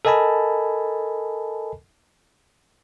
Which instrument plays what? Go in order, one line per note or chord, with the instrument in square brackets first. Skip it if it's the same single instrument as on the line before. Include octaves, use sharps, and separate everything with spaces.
[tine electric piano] A4 A#4 D#5 G#5 A5 B5